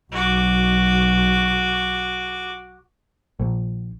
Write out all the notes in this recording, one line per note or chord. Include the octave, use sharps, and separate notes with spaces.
B1 F#4 D6
A#1